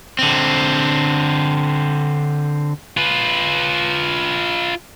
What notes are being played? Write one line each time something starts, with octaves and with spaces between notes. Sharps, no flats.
D3 C4
F4 B4